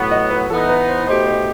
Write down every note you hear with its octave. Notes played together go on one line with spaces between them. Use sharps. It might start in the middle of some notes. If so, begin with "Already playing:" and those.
Already playing: A2 F#3 B3
D#5
B4
E3 B3 D#4 A4
B4
C5
B2 A3 D#4 G4 C5
C5